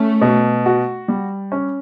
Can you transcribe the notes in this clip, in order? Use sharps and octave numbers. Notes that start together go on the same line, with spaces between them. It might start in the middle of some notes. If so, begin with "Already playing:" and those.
Already playing: A3 C#4
B2
F#4
G3
C#4